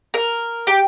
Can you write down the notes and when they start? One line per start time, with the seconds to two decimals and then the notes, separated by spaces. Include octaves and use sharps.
0.14 A#4
0.67 G4